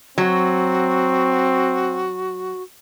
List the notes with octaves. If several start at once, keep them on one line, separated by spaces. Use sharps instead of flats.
F#3 C4 F#4